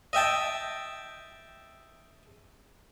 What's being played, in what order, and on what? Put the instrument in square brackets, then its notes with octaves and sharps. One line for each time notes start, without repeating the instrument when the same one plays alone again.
[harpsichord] D#5 E5 G5 A5